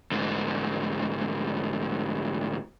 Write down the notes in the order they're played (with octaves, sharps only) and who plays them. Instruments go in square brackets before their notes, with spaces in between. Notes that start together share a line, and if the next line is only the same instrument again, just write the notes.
[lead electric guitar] D2 G#2